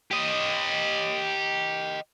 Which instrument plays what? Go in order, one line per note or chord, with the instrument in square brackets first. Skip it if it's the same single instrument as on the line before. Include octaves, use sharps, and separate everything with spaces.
[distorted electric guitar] G4 D#5